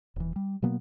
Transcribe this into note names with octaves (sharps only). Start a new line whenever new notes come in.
D#1 E3
G3
B2 F#3 A#3 B3